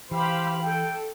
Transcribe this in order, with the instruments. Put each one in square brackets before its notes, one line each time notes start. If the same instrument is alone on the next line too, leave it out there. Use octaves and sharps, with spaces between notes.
[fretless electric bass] E3 [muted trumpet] G4 [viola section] C5 F5 B5
[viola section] A4 [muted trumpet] G5